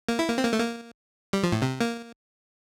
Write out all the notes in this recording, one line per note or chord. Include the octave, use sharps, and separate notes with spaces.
A#3
E4
A#3
C4
A#3
A3
A#3
G3
F3
A2
C3
A#3